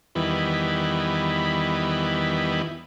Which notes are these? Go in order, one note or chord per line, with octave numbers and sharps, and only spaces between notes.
E2 D#3 E3 G3 B3